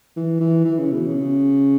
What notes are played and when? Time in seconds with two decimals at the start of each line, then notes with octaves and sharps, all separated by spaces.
0.17 E3
0.40 E3
0.65 E3
0.79 C#3
0.92 B2
1.07 C#3